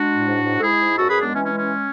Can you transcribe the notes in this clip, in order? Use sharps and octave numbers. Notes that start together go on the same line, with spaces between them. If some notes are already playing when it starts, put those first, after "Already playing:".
Already playing: G#3 D4 F#4
A2
G#2
G#2
A4
G#3 E4 G#4
G#2
F#2 F#4 A4
G#4 B4
G#3
B3 D4
E3 C#4
C#4
G#3
C#4